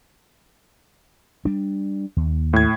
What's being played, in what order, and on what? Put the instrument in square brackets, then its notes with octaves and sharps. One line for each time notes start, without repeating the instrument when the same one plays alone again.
[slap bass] G3 D4
D#2
[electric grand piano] A2 G#6